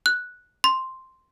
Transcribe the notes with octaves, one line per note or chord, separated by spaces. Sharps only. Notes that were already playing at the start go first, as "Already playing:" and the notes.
F#6
C6